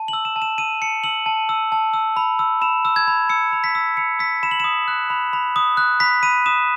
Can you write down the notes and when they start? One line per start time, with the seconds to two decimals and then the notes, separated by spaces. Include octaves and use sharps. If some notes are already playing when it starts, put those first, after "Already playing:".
Already playing: A5
0.08 F#7
0.13 E6
0.25 E7
0.36 A5
0.42 E7
0.58 E6 D#7
0.81 A5 C#7
1.04 E6 F#7
1.26 A5
1.49 E6
1.72 A5
1.94 E6
2.16 B5
2.39 E6
2.61 B5 E7
2.85 E6
2.96 G#6
3.08 B5
3.29 E6 C#7
3.53 B5
3.64 B6
3.75 E6
3.97 B5 C#7
4.19 E6 B6
4.43 B5 E7
4.51 F#7
4.60 D#6 E7
4.88 F#6
5.10 B5
5.33 B5
5.56 D#6
5.77 F#6
6.00 B5 B6
6.23 B5 D#7
6.46 D#6 E7